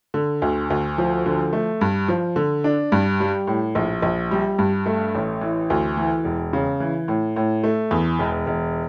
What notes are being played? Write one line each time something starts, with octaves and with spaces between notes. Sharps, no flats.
D3
D2
D2
F3
D3
A3
G2
F3
D3
D4
G2
G3
A2
A#1
A#1
G3
G2
A3
A1
E3
D2
E3
E1
C#3
E3
A2
A2
A3
E2
E1
E1